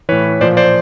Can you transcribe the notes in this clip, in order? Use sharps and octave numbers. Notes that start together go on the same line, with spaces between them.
A2 E3 B4 C#5
A#2 F3 C5 D5
C5 D5